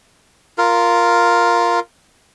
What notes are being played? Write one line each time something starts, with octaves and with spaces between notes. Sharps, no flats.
F4 A#4